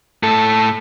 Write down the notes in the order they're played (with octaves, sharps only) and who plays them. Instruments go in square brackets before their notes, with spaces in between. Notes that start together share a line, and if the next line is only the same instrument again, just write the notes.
[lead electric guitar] A2 A4